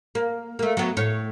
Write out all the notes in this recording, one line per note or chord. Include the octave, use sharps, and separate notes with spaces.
A#3
A3 A#3
F#3 B3
A2 C#5